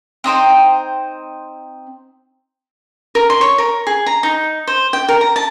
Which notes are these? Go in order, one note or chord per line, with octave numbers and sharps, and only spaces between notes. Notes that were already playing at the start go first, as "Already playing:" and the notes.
C4 D#4 C5 G5
A#4
C6
C#5
A#4
G#4
A#5
D#4
C5
G5
A#4
A#5
A5